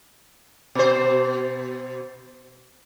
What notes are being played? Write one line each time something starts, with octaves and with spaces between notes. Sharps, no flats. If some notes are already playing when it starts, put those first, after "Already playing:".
B2 C5